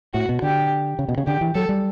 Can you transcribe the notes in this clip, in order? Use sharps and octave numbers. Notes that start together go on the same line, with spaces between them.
A2 F#4
B2
D3 G4
C#3
B2
C#3
D3 G4
E3
F#3 A4
G3